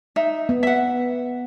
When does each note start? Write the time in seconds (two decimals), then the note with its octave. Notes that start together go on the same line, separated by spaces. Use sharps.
0.16 D#4 E5
0.49 B3
0.63 E5 F#5